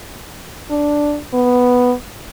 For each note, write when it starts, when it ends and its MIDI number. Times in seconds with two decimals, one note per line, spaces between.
0.70 1.18 62
1.33 1.93 59